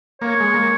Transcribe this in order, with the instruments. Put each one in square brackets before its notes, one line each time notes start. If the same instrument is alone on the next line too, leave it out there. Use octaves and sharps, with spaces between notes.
[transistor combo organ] A#3 [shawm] C#5
[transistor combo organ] G#3
A#3